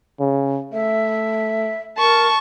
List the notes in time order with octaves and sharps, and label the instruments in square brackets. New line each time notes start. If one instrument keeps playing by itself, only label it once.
[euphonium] C#3
[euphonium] A3 [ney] E5
[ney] A#4 [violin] A5 C#6